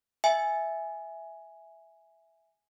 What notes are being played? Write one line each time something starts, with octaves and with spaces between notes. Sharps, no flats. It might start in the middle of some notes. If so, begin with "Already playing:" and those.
E5 G#5